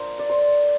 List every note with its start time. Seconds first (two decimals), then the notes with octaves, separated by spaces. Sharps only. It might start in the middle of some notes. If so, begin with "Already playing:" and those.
Already playing: A#3 D4 F4 C5
0.19 D5
0.30 C5